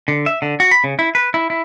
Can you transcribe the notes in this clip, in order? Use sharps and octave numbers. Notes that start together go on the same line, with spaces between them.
D3
E5
D3
F#4
B5
C#3
E4
B4
E4
E4